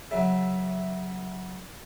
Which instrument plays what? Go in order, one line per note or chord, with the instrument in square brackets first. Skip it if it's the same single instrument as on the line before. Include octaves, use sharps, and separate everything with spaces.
[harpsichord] C#3 F#3 [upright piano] E5